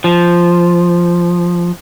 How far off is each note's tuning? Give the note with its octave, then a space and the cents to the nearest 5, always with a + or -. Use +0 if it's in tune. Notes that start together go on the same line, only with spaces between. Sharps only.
F3 -5